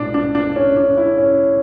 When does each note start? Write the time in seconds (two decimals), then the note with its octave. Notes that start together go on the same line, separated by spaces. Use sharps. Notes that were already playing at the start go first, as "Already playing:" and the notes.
Already playing: B1 A2 G#3 D4
0.14 D4
0.35 D4
0.56 C#4
0.76 D4
0.97 E4
1.18 C#4